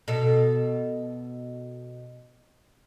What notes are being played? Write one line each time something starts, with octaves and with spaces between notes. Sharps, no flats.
B2 A4